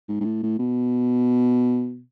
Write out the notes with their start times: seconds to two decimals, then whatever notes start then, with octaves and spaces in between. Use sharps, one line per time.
0.08 G#2
0.21 G#2
0.25 A2
0.43 A2
0.59 B2